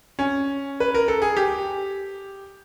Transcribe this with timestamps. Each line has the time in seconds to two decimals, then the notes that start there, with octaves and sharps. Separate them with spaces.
0.19 C#4
0.80 B4
0.94 A#4
1.08 A4
1.22 G#4
1.37 G4